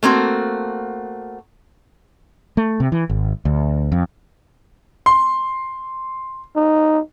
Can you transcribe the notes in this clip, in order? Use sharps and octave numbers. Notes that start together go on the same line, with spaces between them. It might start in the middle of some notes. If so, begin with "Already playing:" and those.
A3 A#3 C4 F#4
A3
C3
E3
G#1
D2
F2
C6
D#4